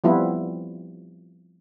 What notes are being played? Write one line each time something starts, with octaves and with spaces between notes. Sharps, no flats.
F3 G3 B3 C4 E4 F4